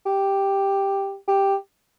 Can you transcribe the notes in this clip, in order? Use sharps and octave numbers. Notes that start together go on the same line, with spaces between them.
G4
G4